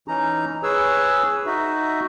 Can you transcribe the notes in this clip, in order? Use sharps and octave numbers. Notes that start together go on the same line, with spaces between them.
E3 C#4 D#4 A#5
G#4 B4 C#5 E6
D#4 F#4 E5